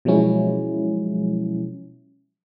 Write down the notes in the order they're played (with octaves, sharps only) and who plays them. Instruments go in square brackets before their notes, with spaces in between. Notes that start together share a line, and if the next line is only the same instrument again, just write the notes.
[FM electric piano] B2 F3 F#3 G#3 C#4 E4